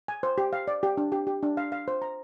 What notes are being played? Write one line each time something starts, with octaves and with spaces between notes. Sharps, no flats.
G#5
C5
G4
F5
D5
G4
D4
G4
G4
D4
F5
F5
C5
A#5